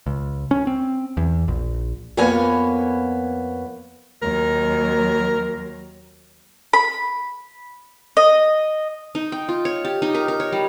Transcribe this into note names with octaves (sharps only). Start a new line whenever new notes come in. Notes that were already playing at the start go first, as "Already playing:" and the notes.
C#2
C#4
C4
E2
A#1
F2 A#3 B3 C#5 G#5
D#2 F#3 A#4
B5
D#5
D#4
G5
F4
C#5
G4
D#4
A#4
A#4
C#5
G3